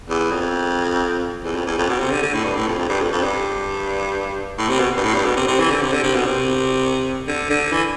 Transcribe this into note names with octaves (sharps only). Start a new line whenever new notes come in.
E2
F2
E2
F2
E2
F2
B2
C3
D3
D3
A2
G2
A2
F2
F2
G2
F2
F2
G2
A2
C3
B2
G2
A2
G2
B2
C3
C3
E3
D3
C3
D3
C3
B2
C3
D3
D3
E3